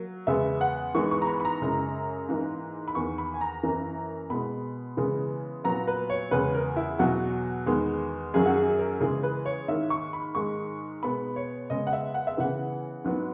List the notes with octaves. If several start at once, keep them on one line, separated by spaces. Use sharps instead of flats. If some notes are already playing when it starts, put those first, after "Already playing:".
Already playing: F#3 A#3
E2 C#3 G#3 B3 E5
F#5
G#2 E3 G#3 B3 C#6
C#6
A#5
B5
B5
A#5
F#2 C#3 G#3
G#2 E3 A#3
B5
E2 D#3 A#3 C#6
B5
G#5
A#5
F#2 E3 A#3
B2 G#3 B3 B5
C#3 E3 G#3 B3
A#2 F#3 B3 A#5
B4
C#5
E2 C#3 G#3 B3 B4
A#4
E4
E2 B2 F#3 F#4
E2 D#3 G#3 B3
F#2 D#3 F#3 G#4
F#4
G#4
G#4
A#4
C#3 E3 G#3 G#4
B4
C#5
G#2 D#3 A#3 E5
C#6
B5
G#2 D#3 G#3 C#6
B2 G#3 B3 B5
C#5
C#3 G#3 B3 D#5
F#5
E5
F#5
E5
C#3 E3 B3 F#5
G#2 F#3 B3